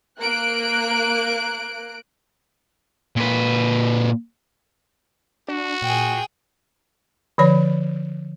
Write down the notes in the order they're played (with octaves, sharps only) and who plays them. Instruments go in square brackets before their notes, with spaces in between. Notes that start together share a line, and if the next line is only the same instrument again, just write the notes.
[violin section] A#3 F#6 D7
[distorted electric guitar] A#2 B4
[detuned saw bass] D4 [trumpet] F#4
[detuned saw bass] A#2 [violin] G#4 G5
[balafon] D3 F3 C#5 B5